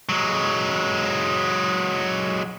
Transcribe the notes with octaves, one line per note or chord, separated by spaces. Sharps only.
F#3 G#3